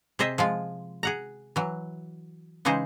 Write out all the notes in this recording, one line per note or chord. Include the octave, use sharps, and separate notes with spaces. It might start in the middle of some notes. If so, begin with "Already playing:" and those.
C3 G#4 C5 D#5 E5
F3 G#3 F4
G#4 F#5 A#5
E3 F#3
C#3 E3 G#3 D#4 G#4 C5